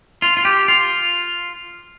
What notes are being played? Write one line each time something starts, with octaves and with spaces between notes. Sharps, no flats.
F4
F4
G4
F4